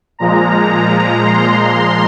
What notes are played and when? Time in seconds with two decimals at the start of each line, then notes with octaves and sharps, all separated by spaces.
0.19 A#2 F3 G#3 A#5
0.54 A#5
1.23 C6